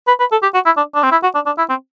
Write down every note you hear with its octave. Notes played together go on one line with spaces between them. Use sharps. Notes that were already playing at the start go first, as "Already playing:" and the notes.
B4
B4
A4
G4
F#4
E4
D4
D4
C4
E4
F#4
D4
D4
E4
C4